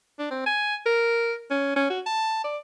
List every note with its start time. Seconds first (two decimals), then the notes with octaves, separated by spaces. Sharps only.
0.19 D4
0.31 C4
0.46 G#5
0.86 A#4
1.51 C#4
1.76 C#4
1.90 F#4
2.06 A5
2.44 D5